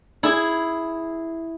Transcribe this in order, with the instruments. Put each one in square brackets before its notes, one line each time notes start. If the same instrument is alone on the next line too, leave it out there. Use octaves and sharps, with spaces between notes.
[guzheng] E4 G#4